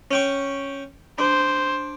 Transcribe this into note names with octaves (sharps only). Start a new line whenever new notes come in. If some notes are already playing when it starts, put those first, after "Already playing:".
C#4 G5 C#6
D4 C5